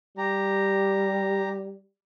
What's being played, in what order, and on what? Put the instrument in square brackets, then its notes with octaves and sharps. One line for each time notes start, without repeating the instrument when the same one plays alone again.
[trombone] G3 [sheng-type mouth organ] G4 A#5